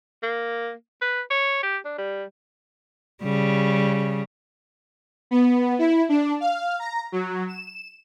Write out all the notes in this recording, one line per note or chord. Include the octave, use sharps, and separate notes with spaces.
A#3
B4
C#5
G4
D4
G3
C#3 G3
B3
E4
D4
F5
A#5
F#3
E7